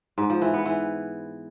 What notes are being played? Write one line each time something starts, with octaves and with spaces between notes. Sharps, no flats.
G#2
F3
E3
B3
E3